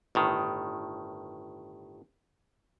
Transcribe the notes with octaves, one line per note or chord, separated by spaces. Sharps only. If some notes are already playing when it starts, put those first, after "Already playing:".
G1 A2 D#3